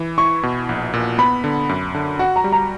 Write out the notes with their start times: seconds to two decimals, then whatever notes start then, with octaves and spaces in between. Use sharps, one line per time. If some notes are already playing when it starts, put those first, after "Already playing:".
Already playing: E3
0.18 E4 C#6
0.43 B2
0.69 A#1
0.94 A#2
1.18 B3 B5
1.44 D3
1.69 F#2
1.95 D3
2.19 F#4 F#5
2.36 A#5
2.44 G3
2.52 A#5